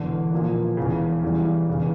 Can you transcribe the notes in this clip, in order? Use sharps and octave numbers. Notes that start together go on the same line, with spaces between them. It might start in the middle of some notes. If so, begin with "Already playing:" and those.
Already playing: E1 E2 D3
A#2 F3 A#3
E1 E2 C#3
E2 C#3 E3 G3
E1 E2 C#3